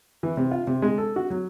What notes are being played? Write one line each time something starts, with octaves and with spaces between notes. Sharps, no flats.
E3
C3
F4
C3
G#3
A4
F#4
F#3